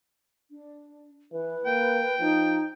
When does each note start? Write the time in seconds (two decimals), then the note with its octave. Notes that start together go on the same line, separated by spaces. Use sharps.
0.51 D4
1.32 E3 B4
1.66 A#3 G5
2.20 F3 D#4